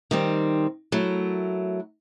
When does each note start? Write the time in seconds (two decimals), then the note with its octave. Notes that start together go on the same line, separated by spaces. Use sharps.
0.11 D#3 G3 C4
0.92 F#3 A3 E4 A#4